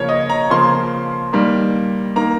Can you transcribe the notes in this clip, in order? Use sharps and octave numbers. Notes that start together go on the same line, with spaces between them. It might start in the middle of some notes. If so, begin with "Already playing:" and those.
Already playing: C#3 F3 A#3 C#5
D#5
A#5
C#3 F3 A#3 C6
D#3 G3 A#3
D#3 A#3 A#5